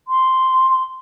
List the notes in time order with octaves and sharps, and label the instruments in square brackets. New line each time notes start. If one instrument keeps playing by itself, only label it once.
[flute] C6